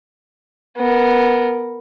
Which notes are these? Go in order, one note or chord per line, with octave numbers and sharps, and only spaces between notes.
B3 A#4